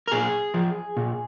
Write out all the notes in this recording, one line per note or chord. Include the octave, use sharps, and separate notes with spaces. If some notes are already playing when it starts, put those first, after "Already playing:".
A#4
A#2 G#4
F3
A#2